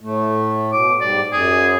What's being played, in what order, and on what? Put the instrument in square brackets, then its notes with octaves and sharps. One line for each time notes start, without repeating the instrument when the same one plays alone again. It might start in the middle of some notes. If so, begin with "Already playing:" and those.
[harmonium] A2 A3
[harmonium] B2 [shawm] D6
[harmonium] G#2 G3 [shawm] D5
[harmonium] F#2 [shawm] G#4